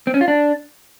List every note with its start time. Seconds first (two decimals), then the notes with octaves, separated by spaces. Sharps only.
0.07 C4
0.14 C#4
0.21 F4
0.28 D4